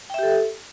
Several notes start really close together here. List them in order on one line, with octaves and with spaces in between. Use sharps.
G5 E5 G4 A4